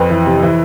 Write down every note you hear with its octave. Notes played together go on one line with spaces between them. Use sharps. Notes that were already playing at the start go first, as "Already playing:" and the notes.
Already playing: F2 B4
E3
C3
E3